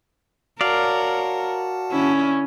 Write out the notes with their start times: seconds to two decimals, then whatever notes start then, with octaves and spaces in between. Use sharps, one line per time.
0.61 F#4 A#4 C#5 D5 F5 F#5 A5
1.92 D3 C#4 E4